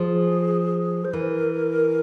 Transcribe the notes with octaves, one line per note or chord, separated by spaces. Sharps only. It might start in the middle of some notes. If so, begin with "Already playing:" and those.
Already playing: F3 G#4
C5
E3 A#4